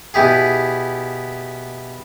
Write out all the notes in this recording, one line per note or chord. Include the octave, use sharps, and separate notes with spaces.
B2 E4 G4 G#4